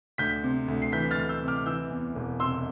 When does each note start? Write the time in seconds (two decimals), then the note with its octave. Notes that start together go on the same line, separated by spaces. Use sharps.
0.18 D2 G6 B6
0.43 C3
0.68 D2
0.82 C7
0.92 E3 G6 B6
1.11 F6 A6
1.17 D2
1.29 E6 G6
1.42 C3
1.48 D6 F6
1.66 E3 E6 G6
1.91 E2
2.15 E1
2.40 C3 C6 E6